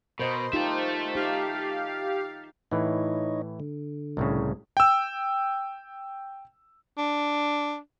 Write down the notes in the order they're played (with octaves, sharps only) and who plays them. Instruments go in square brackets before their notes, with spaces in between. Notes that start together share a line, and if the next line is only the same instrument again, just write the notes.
[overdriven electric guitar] B2 [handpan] A#4 D#5 [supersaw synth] C5
[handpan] D#4 F4 G4 [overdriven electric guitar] A4 E5
[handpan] D#4 [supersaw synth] G4 F5
[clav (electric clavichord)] A2 E3 [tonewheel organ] D#4 C#5 D#5
[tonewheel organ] D3
[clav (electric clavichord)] C2 A2 C#3
[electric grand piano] G5 E6
[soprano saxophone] D4